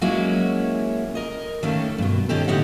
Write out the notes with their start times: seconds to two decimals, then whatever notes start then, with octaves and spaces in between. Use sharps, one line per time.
0.01 F#3 G#3 A#3 C#4 E4 F#4
1.15 A#4 D#5
1.63 D#3 A3 A#3 C#4 A4
1.98 G2 B2
2.29 B2 D#3 C#4 D#4 G4 A4
2.48 A2 D3 D#4 G4 C#5 F#5